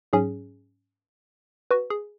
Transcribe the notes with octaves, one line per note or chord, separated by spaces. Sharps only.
G#2 F#3 C#4 G#4
F#4 B4
G#4